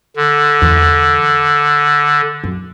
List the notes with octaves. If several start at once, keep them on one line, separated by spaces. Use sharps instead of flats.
D3
E2
F#2